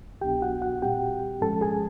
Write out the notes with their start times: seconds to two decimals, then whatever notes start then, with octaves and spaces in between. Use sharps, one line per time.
0.21 C2 B2 F#3 B3 D4 G4 G5
0.42 F#4 F#5
0.62 F#4 F#5
0.82 A#2 G3 C4 G4 G5
1.41 G#2 F3 G#3 C#4 A4 A5
1.61 G#4 G#5